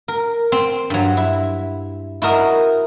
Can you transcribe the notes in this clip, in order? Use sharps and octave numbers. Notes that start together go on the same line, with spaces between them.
A#4
C4
G2 F#3
E4 E5
E4 F#4 A#4 D#5